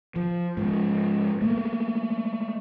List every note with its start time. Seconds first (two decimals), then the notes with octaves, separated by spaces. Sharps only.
0.16 F3
0.57 G#2 F3
1.41 A3 A#3